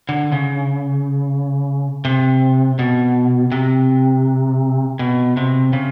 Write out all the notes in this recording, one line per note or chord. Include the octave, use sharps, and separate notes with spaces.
D3
C#3
C3
B2
C3
B2
C3
C#3